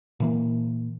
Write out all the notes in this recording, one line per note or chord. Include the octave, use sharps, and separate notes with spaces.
A#2 E3 A#3